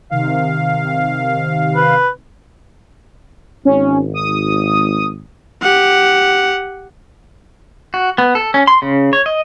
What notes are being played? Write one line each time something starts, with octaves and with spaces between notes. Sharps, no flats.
C3 D#3 F5
B4
G#1 C#4
D#6
G4 F#5
F#4
B3
A4
C#4
C6
C#3
C#5
D#5